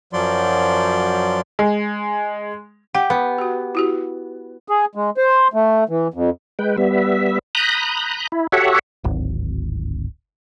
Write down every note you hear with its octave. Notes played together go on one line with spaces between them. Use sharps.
F#2 F3 F#3 D5 C6
G#3
G4 F#5
B3
F#4 G4
E4 F#4 G4
G#4
G#3
C5
A3
E3
F2
G#3 B4 G5
G3 B3 E5
A#5 B5 D#6 F#6 G6
E4
F#4 G4 A4 C#5 E5 F#5
D1 G#1